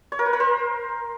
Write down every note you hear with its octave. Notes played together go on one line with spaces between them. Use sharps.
C#5
A#4
B4
A#4
C5